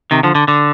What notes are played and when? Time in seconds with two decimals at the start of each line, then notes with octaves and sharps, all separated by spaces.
0.11 C3 D#3
0.23 D3 F3
0.35 D3
0.48 D3